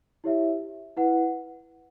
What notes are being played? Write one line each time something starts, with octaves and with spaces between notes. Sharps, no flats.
E4 G4 C#5 E5
E4 B4 F#5